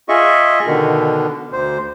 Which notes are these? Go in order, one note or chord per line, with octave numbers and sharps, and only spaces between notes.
F4 G#4 D#5 E5 C#6
B2 D3 D#3
D2 C5